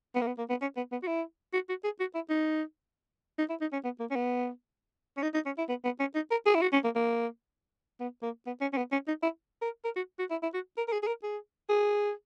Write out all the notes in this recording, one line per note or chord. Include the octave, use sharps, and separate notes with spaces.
B3
A#3
B3
A#3
B3
C#4
B3
B3
F#4
E4
F#4
F#4
G#4
F#4
E4
D#4
D#4
E4
D#4
C#4
B3
A#3
C#4
B3
C#4
D#4
D#4
C#4
E4
B3
B3
C#4
D#4
A#4
G#4
E4
F#4
C#4
A#3
A#3
B3
A#3
B3
C#4
C#4
B3
C#4
D#4
E4
A#4
A#4
F#4
F#4
E4
E4
F#4
A#4
A#4
G#4
G#4
A#4
G#4
G#4